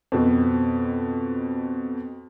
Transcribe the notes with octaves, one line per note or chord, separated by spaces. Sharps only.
F2 B2